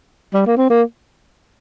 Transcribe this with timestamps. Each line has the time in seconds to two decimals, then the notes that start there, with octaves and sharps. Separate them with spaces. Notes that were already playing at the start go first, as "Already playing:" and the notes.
0.34 G3
0.47 A#3
0.57 C4
0.70 A#3